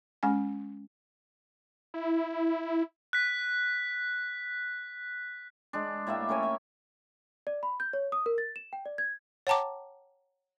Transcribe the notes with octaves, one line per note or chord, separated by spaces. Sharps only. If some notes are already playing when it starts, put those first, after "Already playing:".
G#3 C#4 G#5
E4
F#6 B6
G#3 D4
A2 A#3 G4 E5
C#4 A#4 C#5 G#5
E5
D5
B5
G6
C#5
D#6
A#4
A6
E7
G5
D5
G#6
C#5 F#5 G5 A5 A#5 D6